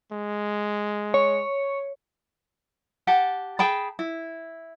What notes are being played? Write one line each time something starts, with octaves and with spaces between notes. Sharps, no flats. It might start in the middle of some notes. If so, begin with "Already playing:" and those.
G#3
C#5
G4 F#5 A5
G#4 G5 A5 B5
E4